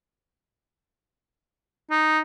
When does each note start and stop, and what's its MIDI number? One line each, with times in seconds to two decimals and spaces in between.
1.90 2.20 63